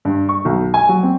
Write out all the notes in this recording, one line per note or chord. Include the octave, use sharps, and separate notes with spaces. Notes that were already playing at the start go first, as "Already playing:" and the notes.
G2
C#6
B1
G#5
F#3
C4